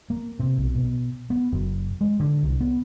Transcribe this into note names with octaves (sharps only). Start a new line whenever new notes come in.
A#3
C3
B1
B2
B3
F#1
G#3
D3
C2
B3